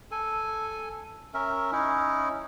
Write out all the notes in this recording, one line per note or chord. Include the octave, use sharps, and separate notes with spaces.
A4 G#5
C#4 A#4 E5
C#4 D#4 E4